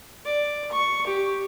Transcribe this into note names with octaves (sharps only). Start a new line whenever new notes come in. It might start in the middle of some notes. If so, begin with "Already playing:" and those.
D5
C#6
G4